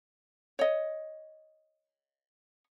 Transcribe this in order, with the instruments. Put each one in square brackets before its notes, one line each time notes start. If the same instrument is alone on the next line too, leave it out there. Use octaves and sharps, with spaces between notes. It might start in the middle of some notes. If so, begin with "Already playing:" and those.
[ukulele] C#5 D#5